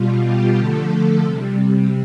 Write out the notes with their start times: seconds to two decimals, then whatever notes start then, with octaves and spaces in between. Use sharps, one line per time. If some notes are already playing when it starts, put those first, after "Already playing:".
Already playing: B2 G3 F4
0.26 G4
0.59 D3 F3 A3 A4
1.23 C3 G3